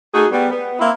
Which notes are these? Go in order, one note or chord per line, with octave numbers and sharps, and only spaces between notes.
A3 D#4 F#4 G#4
G3 B3
B3
A#3 C4 E4